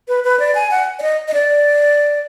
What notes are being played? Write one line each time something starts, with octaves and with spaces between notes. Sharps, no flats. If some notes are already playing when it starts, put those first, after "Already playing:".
B4
B4
D5
G#5
F#5
D5
D#5
D#5
D5